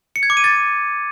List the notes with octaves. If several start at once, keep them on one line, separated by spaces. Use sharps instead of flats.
C#7
G#6
D6
D#7
A6